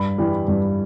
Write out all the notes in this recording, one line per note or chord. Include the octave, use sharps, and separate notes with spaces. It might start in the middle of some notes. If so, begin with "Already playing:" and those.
Already playing: G2 B5
E3 G3
G2